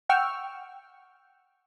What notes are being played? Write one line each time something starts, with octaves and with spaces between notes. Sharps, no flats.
F#5 G5 C#6 E6 F6